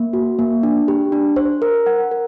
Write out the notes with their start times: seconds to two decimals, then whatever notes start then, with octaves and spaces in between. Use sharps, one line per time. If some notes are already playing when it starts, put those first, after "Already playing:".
Already playing: A#3
0.13 F#4
0.39 A#3
0.63 D4
0.88 G4
1.12 D4
1.36 C5
1.62 A#4
1.86 F#5
2.11 A#4